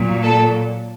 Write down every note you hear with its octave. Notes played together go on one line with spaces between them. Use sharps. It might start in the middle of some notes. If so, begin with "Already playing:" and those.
Already playing: A#2 F#3
A4